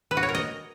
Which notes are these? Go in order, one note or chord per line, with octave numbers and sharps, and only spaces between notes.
B4
F#4
C#5
A#4
D#5